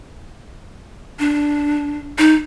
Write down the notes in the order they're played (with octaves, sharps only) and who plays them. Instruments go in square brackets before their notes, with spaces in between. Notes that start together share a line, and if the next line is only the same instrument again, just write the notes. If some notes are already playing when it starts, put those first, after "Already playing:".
[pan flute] D4
D#4